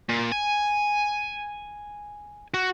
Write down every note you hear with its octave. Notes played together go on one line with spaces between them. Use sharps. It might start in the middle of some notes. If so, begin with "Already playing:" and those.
A#2
G#5
F#4